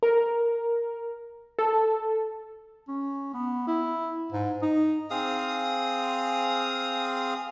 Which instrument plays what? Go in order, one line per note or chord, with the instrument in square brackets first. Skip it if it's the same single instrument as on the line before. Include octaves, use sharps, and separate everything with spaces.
[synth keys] A#4
A4
[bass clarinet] C#4
B3
E4
G#2
D#4
[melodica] C4 G#4 F5 D#6